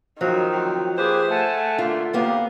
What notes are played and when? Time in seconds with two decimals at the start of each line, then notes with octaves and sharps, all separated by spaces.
0.21 F2 D#3 F3 F#3
0.52 D2 F#3 C4
0.98 A#3 G4 G#4 B4 C5
1.31 A3 F#5 G#5 A5
1.78 D3 A#3 D4 F4
2.13 D2 A2 A#3 B3 G4 F5